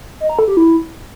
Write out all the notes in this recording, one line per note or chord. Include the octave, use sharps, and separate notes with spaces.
D#5
A#5
A4
G4
E4